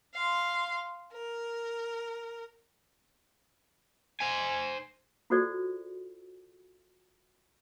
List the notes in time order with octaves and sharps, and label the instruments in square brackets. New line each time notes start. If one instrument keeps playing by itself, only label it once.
[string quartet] F5 C6
A#4
[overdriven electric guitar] C5 G#5
[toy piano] F4 F#4 G#4 A4 C5 D5